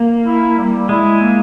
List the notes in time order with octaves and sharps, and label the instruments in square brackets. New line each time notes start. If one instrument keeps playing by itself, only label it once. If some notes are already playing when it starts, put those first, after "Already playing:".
Already playing: [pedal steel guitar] A#3
[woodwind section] E4
G3
[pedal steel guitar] G#3 [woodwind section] E4
[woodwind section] A#3